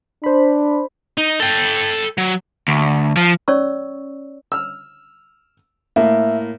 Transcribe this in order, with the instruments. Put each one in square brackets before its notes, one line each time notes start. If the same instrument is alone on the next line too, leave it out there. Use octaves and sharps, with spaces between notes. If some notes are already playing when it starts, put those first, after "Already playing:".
[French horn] D4 [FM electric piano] C5 B5
[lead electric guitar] D#4
A4 G5
F#3
[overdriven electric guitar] D2
F3
[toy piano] C#4 C#5 D5 C#6 E6
[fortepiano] E6 F6
[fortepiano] A2 A#3 [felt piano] E5